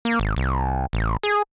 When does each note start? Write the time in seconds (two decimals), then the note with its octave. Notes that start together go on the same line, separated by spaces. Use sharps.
0.05 A#3
0.20 G#1
0.36 C2
0.93 A1
1.23 G#4